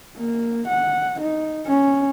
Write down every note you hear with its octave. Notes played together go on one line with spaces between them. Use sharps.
A#3
F#5
D#4
C#4